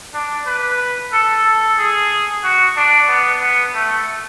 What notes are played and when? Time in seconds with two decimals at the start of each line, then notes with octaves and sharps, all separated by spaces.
0.14 D4
0.47 B4
1.13 A4
1.46 A4
1.78 G#4
2.44 F#4
2.76 D4
3.09 B3
3.42 B3
3.74 A3